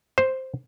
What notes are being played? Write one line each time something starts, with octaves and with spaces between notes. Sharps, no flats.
C5